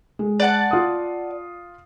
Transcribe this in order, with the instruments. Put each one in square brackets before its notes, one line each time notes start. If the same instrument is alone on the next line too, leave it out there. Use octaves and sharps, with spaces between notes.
[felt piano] G#3
[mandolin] D5 F#5 A5
[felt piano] F4 D#6